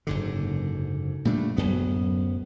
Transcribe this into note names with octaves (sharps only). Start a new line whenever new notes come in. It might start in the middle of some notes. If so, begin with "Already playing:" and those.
F#1 G#2 D3
A#2 G3 A3 D4
D1 G#1 F#2 B3